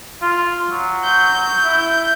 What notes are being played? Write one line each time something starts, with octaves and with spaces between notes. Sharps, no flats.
F4
F#3
G6
E4